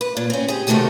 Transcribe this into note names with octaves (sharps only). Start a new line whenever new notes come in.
B4
A#2
C4 C#4
G4 G#4
C3 D#3 E3 A3 F#4 G4